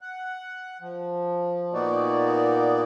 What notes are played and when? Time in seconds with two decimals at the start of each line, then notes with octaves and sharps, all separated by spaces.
0.01 F#5
0.81 F3
1.73 A#2 A#3 B3 D#4 F#4 D5